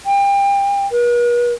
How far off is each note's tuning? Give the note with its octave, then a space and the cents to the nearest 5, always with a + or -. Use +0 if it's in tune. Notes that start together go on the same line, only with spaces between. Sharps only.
G5 +30
B4 -45